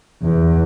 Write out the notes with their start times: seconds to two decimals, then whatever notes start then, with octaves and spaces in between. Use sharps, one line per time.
0.22 E2